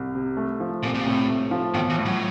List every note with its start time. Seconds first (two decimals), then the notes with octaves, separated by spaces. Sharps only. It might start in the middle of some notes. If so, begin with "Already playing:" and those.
Already playing: C2
0.15 C3
0.37 A3
0.60 F3
0.83 C2 A#2
0.94 A#2
1.06 A2 C3
1.29 A3
1.51 F3
1.74 B1 D#3
1.90 E3
1.98 A2
2.06 F#3